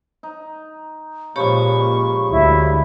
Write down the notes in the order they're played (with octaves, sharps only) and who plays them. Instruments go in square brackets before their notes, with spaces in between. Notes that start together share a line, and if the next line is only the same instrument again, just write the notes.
[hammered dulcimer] D#4
[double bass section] A#2 [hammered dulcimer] C#3 F3 G#3 [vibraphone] G4 C#5 B5 [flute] C#6
[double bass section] D2 [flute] E4